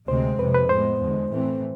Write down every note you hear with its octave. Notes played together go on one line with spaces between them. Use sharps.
D2 C3 G#3 C4 C5
F2 C3 G#3 B4
B4
A2 G#3 B3 C5
E2 D3 G#3
A2 E3 A3 C4